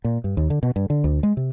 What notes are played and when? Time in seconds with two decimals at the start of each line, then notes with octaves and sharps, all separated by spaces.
0.04 A#2
0.24 G2
0.37 D#2
0.50 D3
0.63 B2
0.76 G2
0.90 D3
1.04 D2
1.23 G#3
1.37 C3